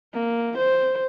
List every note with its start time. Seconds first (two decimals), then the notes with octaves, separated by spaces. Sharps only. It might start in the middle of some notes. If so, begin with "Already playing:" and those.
0.14 A#3
0.58 C5